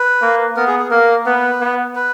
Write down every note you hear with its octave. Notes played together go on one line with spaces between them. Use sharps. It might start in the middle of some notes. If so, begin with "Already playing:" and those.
Already playing: B4
A#3
B3 A#4
G#4
G#4
A#3 A#4
B3 B4
B3
B4